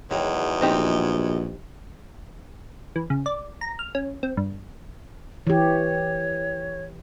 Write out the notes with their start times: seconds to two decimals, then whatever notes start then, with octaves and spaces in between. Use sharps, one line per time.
0.11 E2 D#3 F#3 G#3
0.61 A#1 C4 D#4 G4
2.96 E3
3.10 C#3
3.26 D5
3.61 A#5
3.79 F6
3.95 C#4
4.23 C4
4.37 G2
5.47 E3 G4 C#5